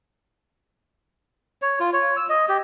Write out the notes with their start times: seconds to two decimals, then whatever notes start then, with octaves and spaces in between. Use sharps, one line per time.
1.62 C#5
1.80 F4
1.93 C#5
2.16 E6
2.29 D#5
2.49 G4